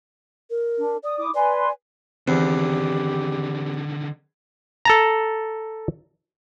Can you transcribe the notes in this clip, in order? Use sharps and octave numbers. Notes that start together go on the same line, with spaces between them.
A#4
D4
D5 D#6
E4 D6 D#6
B4 D5 G#5 C6
E2 D3 D#3 C4 G4
A4 A5 A#5